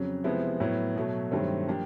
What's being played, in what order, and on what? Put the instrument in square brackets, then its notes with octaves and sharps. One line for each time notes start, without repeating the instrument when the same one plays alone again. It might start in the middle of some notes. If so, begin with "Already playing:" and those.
Already playing: [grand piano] F2 C#3 F#3
C3 F3 G#3 B3 E4
A2 F#3 B3
B2 F#3 A3
G2 D#3 F#3 A3 C4
F3 A#3 D4 G4